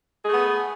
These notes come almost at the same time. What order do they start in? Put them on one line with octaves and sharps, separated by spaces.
G#4 A3 B3